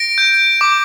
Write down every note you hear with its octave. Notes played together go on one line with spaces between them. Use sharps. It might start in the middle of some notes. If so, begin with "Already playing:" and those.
Already playing: A#6 D7
G6
D6